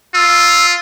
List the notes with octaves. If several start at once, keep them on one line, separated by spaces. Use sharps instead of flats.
F4 E6